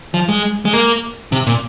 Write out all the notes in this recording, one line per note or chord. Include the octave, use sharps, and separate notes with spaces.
F3
G#3
G#3
A#3
C3
A#2